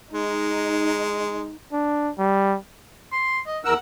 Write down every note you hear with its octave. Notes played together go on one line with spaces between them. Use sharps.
G#3 D#4
D4
G3
C6
D#5
E2 A#4 F#5 E6